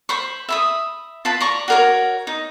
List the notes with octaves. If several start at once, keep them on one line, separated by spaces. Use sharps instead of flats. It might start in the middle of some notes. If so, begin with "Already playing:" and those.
C5 B5 C#6
E5 B5 D#6
F4 B4 A5 B5
D5 A#5 C#6
F#4 A#4 C#5
D#4